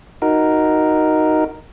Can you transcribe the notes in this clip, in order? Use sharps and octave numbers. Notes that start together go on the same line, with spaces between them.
D#4 F#4 A#4